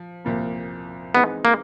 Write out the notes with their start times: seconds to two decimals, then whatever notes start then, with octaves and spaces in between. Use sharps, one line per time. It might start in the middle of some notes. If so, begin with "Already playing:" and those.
Already playing: F3
0.25 C2 A#2 F3 A#3
1.15 E3 G#3 B3 C4 D#4 G#4
1.45 A#3